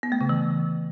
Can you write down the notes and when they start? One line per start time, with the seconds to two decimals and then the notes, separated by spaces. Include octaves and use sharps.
0.03 B3
0.12 A3
0.21 C#3
0.29 E3